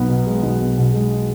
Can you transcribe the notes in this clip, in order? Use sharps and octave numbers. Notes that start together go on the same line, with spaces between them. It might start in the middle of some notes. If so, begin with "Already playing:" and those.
Already playing: B1 B3
B2
G#3
B1
B3
B2
G#3